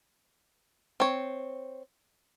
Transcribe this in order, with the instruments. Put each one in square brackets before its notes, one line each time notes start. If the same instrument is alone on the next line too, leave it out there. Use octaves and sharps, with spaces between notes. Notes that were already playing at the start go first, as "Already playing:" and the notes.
[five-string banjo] C4 C#5